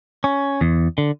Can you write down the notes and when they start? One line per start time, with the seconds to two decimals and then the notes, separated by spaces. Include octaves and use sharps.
0.24 C#4
0.61 E2
0.98 D3